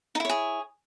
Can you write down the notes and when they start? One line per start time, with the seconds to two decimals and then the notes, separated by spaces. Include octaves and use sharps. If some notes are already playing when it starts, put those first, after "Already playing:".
0.15 D#4
0.20 E4
0.25 C#5
0.29 G#4